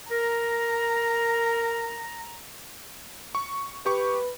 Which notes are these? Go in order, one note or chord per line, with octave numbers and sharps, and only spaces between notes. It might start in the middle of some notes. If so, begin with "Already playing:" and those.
A#4 A#5 A#6
C#6
G4 B4 C#6